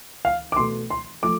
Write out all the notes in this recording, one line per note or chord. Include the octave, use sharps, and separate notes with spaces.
F5
D6
B2 A3 C6
C6
F3 A3 D6